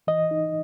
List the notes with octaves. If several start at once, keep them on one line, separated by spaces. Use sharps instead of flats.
E3 D#5
D#4